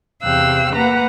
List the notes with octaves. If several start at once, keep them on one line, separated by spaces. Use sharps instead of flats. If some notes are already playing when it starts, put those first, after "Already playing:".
E2 C3 F5 G5 E6 F#6
A#3 B4 F#5 A#5